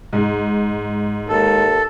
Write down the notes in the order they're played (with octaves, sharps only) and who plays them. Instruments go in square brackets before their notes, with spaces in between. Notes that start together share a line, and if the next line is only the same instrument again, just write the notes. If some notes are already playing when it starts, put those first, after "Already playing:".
[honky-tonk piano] G#2
[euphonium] D#2 [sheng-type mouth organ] A4